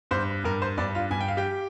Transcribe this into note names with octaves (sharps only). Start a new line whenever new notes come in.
G2 C5
G2 A#4
C5
G2 D4 D5
F4 F5
G2 G#5
G5
F5
G4 G5